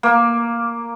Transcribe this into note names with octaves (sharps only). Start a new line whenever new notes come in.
A#3